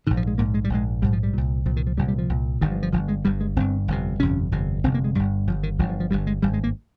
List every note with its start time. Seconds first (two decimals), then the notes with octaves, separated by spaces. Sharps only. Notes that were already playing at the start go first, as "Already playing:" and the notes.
0.07 A#1 G#2 D#3
0.17 F3
0.27 G#3
0.38 A#1 G#2 A#3
0.54 G#3
0.64 G3
0.70 A#1 G#2 G#3
1.02 A#1 G#2 G3
1.13 F3
1.23 G3
1.34 C2 A#2
1.66 C2 A#2 F3
1.77 D#3
1.87 F3
1.98 C2 A#2 G3
2.08 G3
2.18 F3
2.30 C2 A#2
2.61 G1 G2 D#3
2.71 F3
2.83 F3
2.93 G1 G2 F3
3.08 G#3
3.25 G1 G2 G3
3.40 G#3
3.56 G1 G2 C4
3.88 G1 F2 C3
4.20 G1 F2 C3 C#4
4.52 G1 F2 C3
4.84 G1 F2 C3 C4
4.94 A#3
5.04 G#3
5.15 G1 G2 G3
5.47 G1 F3
5.51 G2
5.63 D#3
5.79 G1 G2 F3
5.90 F3
6.00 F3
6.11 G1 G2 G3
6.27 G#3
6.42 G#1 G2 G3
6.53 G#3
6.64 A#3